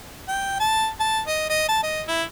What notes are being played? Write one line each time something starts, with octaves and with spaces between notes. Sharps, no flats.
G5
A5
A5
D#5
D#5
A5
D#5
E4